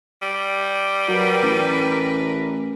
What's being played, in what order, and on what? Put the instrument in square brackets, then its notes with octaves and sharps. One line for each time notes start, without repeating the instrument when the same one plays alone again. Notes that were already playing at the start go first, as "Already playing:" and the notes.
[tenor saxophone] G3
[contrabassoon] F#3 [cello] A#4 B4
[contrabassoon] A1